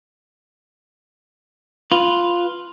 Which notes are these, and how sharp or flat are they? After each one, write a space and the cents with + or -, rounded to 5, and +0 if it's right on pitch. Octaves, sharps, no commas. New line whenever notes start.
F4 +0 B4 +0